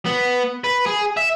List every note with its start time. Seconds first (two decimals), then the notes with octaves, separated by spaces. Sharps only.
0.06 B3
0.64 B4
0.86 G#4
1.17 E5